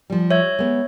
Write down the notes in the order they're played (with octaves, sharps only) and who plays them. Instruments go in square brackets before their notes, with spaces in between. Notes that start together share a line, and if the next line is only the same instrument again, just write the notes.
[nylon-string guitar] F3 G3
[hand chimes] C#5 E5 G#6
[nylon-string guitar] G#3 B3